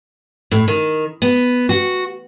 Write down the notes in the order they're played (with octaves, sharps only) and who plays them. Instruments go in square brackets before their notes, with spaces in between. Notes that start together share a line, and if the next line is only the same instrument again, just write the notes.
[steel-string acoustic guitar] A2
D#3
B3
F#4